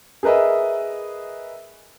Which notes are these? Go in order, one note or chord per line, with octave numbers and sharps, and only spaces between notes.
G#4 A#4 B4 D#5 E5